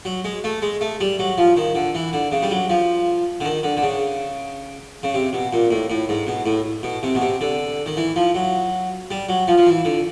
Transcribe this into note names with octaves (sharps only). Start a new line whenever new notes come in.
F#3
G#3
A3
G#3
A3
G3
F#3
F3
D#3
D3
E3
D3
C#3
G3
F#3
F3
D3
D#3
D3
D3
C#3
C#3
C3
B2
A#2
A2
A2
G#2
B2
A2
B2
C3
B2
C3
D3
D#3
E3
F3
F#3
G3
F#3
F3
F3
E3
D3